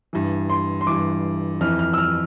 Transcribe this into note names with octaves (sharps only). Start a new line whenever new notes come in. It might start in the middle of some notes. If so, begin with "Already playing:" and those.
G2 E3
C6
C6
G2 E3 D6
F2 E3 F6
F6
E6
F6